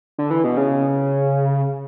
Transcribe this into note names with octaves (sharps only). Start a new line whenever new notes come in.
D3
E3
B2
C#3